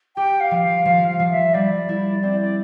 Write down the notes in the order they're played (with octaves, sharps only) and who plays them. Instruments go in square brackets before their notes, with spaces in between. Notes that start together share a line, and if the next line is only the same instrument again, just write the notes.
[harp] G4 [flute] G5
[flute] F5
[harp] F3
[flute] F5
[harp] F3 [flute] F5
[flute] F5
[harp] F3
[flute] E5
[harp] G3 [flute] D5
[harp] E4
[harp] C4 [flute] D5
[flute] D5